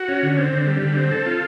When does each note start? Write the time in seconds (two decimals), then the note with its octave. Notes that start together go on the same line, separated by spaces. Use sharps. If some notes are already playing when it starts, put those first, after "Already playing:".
Already playing: F#4
0.09 C#4
0.23 D3
0.38 C4
0.53 D3
0.67 G3
0.82 D3
0.97 C4
1.11 A4
1.26 F4